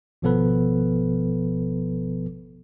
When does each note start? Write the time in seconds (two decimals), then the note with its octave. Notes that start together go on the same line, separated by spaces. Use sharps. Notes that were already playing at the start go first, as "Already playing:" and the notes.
0.22 G#1 B2 F3 B3 A4 B4